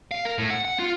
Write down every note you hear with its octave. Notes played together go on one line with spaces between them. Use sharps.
F5
A#4
A2
F#5
F#5
F4